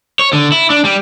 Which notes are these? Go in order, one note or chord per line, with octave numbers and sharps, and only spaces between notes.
C#5
D3
E4
D4
G3